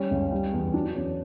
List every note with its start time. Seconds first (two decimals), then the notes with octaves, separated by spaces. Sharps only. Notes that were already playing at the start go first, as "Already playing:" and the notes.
Already playing: G3 C#4
0.11 C#2
0.32 G3
0.53 E2
0.74 F#3 D4
0.95 E2 C#4